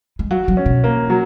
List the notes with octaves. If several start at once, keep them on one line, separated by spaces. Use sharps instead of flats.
G#3
F#3 F#4
F#3
C#4
B2
A#3
F#3